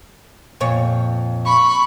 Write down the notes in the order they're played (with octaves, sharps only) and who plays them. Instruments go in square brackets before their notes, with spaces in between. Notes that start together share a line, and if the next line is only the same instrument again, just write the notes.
[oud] F2 A#2 C#5
[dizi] B5 [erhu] C#6